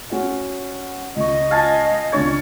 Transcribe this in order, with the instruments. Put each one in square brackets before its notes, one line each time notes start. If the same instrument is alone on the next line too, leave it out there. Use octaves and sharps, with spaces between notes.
[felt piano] C#4 F#4 F#5
[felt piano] C#2 C#6 [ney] D#5
[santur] F5 G#5 A5
[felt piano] C#2 D4 A6 [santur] C#5